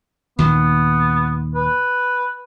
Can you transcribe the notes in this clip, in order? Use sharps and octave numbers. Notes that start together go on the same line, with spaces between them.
D#2 A#2 D#3 B3
B4